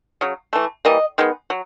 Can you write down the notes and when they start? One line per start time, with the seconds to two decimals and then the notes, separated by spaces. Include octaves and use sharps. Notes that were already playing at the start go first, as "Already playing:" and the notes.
0.21 C#3 F#3
0.53 E3 A3
0.85 E3 G3 A#3 D#5
1.18 D#3 G#3 B3
1.50 F#3